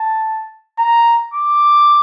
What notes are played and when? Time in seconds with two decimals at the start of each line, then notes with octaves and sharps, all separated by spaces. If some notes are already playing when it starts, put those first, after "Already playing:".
Already playing: A5
0.79 A#5
1.34 D6